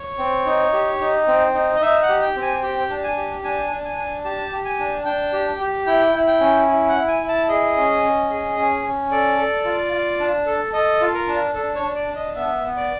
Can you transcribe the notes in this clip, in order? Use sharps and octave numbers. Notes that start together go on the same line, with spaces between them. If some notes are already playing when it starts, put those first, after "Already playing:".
Already playing: C#5
C4
D#4
G4
D#4
C4
D#4
D#5
D#4 E5
F#5
G4
G5
C4
G#5
G4 G5
D4
G#5
G4
D4 G#5
D4
G#5
D4
G4 A5
G4
G#5
D4
D4 G5
G4
G4
E4 G5
E4
G5
C#4
E4
F#5
E4
G#5
E4
A5
G#4 D#5
C#4
C#4
G#4
C#4
C#4
A4 D5
A4
F4
F4
D4
A4
A4 D#5
F4
A#4
D4
D4 A4
C#5
D4
D5
D4
D#5
B3 E5
B3
D5